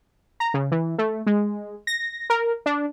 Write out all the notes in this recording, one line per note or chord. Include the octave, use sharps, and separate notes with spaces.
A#5
C#3
E3
A3
G#3
A#6
A#4
D4